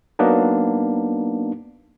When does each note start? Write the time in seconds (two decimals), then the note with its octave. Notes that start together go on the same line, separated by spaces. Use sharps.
0.19 F#3 A#3 B3 D4 D#4